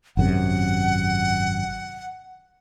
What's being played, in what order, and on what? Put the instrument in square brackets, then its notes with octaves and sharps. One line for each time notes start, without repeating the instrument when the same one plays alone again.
[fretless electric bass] G#1 F#2 C3 [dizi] F#5